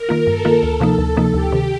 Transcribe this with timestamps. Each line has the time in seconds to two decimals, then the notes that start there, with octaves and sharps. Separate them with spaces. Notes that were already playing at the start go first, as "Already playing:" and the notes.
Already playing: A#4
0.09 D#3 A#3 F4
0.27 G2 A4
0.45 D#3 A#3 F4
0.63 D2
0.80 C3 F3 A#3 D#4
0.98 D2
1.17 C3 F3 A#3 D#4
1.34 D2 G4
1.52 C3 D#3